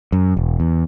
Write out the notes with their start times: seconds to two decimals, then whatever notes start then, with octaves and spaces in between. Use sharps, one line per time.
0.12 F#2
0.37 E1
0.60 E2